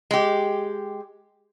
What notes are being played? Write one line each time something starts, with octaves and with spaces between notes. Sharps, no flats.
G#3 G4